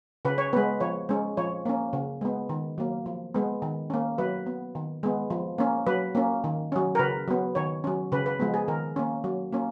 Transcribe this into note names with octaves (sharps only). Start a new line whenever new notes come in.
C#3 B4
C#5
G#3 B3 B4
F3 C#5
G#3 C#4
F3 C#5
A#3 C#4
C#3
G#3 B3
D#3
F#3 A#3
F3
G#3 B3
D#3
A#3 C#4
F#3 B4
B3
D#3
G#3 B3
F3
A#3 C#4
F#3 B4
A#3 C#4
D#3
F#3 C#4
A#4
C#3 B4
F#3 B3
D#3 C#5
F#3 C#4
C#3 B4
B4
F3 G#3 B3
G#4
D#3 A#4
A#3 C#4
F#3
A#3 C#4